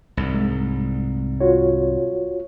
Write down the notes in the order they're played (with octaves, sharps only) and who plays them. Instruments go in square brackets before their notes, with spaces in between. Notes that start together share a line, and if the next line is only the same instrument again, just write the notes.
[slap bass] C2 G#2
[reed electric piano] G#3
F4 F#4 C#5